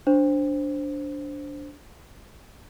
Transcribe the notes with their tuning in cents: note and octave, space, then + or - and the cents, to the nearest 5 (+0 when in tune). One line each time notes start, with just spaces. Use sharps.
D4 -10 C5 +0